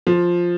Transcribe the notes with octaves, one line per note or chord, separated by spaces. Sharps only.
F3